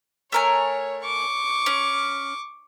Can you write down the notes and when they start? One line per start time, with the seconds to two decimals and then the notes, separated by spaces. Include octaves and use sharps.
0.32 A3 A#4 C#5 G#5
1.04 C#6 D6
1.66 C#4